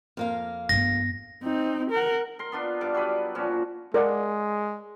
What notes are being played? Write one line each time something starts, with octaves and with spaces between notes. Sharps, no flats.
F2 A#3 F5
G2 B3 A#6
C4 D#4
A#4 F#5
A#4 C6
B3 D4 F4
G2 F5 D6
F#3 G3 B4
A#2 F3 C#4 F#4
G#3 A#4 D5 F#5